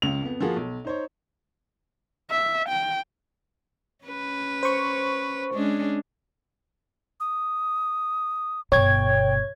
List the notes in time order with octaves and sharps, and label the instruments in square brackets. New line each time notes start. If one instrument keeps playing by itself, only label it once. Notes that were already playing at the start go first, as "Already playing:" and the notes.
[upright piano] C#2 C#3 F7
F2 B3
F3 A#3 F4 F#4 G#4
B1
D#4 C5 C#5
[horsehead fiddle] E5
G5
[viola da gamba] C#4 B4
[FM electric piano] C5 C#6
[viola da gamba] G#3 C#4 D4
[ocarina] D#6
[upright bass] G1 B2 [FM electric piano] C#5 G#6 [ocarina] G5